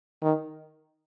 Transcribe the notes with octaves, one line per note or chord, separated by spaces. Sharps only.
D#3